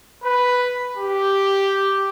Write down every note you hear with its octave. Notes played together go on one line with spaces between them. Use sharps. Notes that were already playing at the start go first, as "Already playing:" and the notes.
B4
G4